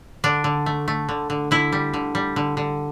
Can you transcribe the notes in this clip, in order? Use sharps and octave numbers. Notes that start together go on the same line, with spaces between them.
D3 D4
D3
A3
A3
D3
D3
D3 E4
G3
D3
G3
D3
D3